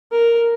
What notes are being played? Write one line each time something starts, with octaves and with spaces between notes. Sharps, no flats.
A#4